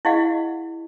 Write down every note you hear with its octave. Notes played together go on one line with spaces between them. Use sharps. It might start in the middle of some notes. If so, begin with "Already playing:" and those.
E4 G#4 D#5 F5 F#5